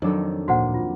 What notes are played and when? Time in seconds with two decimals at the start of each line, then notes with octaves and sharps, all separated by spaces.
0.02 F2 D#3 F#3 D4 A4
0.48 D2 A#2 A#3 F#4 C5 F#5
0.74 F4